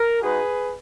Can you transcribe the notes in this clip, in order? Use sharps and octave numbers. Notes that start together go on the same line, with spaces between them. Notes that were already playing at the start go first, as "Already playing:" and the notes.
Already playing: A#4
G#3 D#4 F#4 G#4 B4